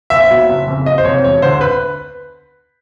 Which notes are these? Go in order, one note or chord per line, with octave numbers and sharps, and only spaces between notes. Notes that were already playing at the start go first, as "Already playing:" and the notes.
A#1 E5
A#2 F#3 B3
F#1
F2 C#3
F#1 D#5
C5
F2 C3 C#5
E1 C#5
D2 D3 C5
B4